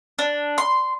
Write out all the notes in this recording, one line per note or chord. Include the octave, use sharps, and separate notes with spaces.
D4
C6